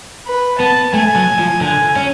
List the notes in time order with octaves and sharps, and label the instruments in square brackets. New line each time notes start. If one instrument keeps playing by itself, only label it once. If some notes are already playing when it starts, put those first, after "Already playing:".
[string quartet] B4
[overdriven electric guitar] B3 [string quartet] A5
[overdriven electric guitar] A3 [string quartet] G#5
[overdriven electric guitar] F#3
F3
[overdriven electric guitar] D3 [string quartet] G#5
[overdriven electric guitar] C#4